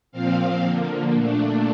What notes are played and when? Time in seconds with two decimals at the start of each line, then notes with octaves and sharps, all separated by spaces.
0.12 A#2 F3 C4 F5
0.62 D3 F3 A#3
1.13 A#2 A3 D4